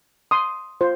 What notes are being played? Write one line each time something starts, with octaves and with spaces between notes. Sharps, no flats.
C6 D#6
F4 C5